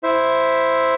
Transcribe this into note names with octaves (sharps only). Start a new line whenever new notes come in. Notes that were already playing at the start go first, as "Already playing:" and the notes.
E4 C5 E5